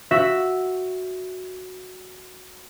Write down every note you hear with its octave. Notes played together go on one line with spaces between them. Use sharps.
F#4 E5